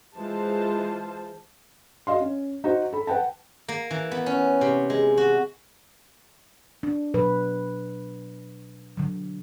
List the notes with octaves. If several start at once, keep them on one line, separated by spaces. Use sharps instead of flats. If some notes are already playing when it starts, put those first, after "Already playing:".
E3 G#3 F4 C5 A5
F#4 D#5 F5 C6
C#4
D#4 F#4 C5
A4 B5
B4 F#5 G5 A5
A#3
E3
B3
C#4
C3
G#3
F#4
D4
B2 F#3 B4
D3 F#3